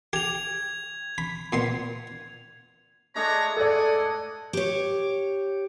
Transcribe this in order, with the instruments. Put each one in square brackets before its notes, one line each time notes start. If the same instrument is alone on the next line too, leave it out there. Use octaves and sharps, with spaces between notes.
[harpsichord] G4 [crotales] G#6 F7
[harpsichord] B5
A#2 B3 C6
[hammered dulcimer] G#3 A3 D4 [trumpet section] G#4 C#5 A#5
[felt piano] A4 D5 [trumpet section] D#5 F#5 G#5
[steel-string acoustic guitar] G4 C#5